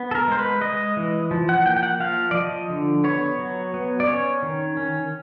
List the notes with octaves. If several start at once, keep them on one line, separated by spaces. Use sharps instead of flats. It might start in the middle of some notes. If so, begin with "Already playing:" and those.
Already playing: B3
A4
A#4
G#3 C5
B4
G#3 D#5
E3
F3
F#5
A#3 G5
G5
F#5
F3 F5
D5
F3 D#5
D3
B3 C#5
F#3
B3
D5
C#4 C#5
D#3
C#4